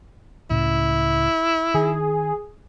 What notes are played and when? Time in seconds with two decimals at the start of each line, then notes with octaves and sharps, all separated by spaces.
0.50 C#2 A2 C#3 E4
1.74 D#3 G#4